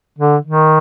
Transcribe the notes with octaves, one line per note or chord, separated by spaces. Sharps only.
D3
D#3